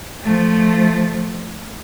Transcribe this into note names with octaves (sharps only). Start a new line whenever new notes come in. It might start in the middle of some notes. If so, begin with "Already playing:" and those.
F3 A3